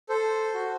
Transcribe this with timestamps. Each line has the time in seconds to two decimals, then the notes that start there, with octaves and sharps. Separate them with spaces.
0.09 A4 C5
0.54 F#4